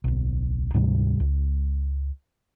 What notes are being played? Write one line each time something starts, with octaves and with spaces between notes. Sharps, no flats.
D1 B1
D2 G#2 C3 G3
C#2